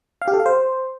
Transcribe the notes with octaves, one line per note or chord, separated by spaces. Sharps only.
F5
G4
A4
F5
C5